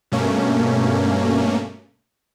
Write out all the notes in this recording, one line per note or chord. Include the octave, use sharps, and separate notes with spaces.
G2 B2 A3 A#3 C#4